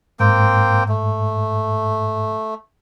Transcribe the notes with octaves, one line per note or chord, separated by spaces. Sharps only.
G#2 A#3 C4 G5
A3